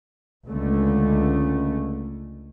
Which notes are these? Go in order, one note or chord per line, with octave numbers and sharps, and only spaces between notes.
C#2 D3 A3